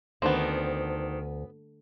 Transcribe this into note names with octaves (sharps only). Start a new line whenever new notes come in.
D2 D#3 B3 C4 D4 C5